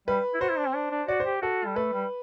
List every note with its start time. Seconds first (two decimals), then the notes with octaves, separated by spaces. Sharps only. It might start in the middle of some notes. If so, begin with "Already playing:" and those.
0.08 G3 B4
0.34 E4
0.41 F#4 C5
0.50 E4
0.58 D4
0.67 C4
0.75 D4
0.91 D4
1.08 F#4 D5
1.20 C5
1.26 G4
1.42 F#4 A4
1.66 G3
1.76 A3 B4
1.93 G3